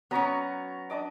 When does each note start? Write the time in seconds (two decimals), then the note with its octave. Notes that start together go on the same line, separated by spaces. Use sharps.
0.11 F#3 B3 C#4 A#5 C#6
0.90 D4 D#5 D6